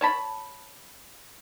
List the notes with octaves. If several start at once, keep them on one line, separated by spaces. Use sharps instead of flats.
C#5 A5 B5